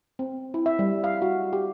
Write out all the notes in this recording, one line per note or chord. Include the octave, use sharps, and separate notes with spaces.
C4
E4
E5
G3
F5
F#4
G4